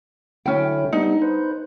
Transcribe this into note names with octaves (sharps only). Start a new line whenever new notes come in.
D3 F#3 C#4 E4 G5
G3 B3 D4 D#4
B4 C5